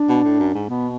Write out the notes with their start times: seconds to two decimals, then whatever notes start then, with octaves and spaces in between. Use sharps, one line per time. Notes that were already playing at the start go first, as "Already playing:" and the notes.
Already playing: D4
0.09 B2
0.24 A2
0.40 F#2
0.54 G#2
0.70 B2 B3